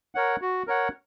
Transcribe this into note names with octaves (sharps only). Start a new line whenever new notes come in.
A#4 C#5 F#5
F#4
A#4 C#5 F#5